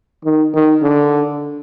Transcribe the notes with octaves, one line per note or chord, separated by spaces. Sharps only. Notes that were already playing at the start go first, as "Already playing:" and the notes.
D#3
D#3
D3